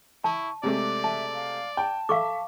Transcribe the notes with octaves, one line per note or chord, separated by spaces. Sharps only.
E4 A5 C#6
C3 G#3 A3 D5 D6
E5 A5
F5
G5 A5
A4 E5 F5 C#6 D6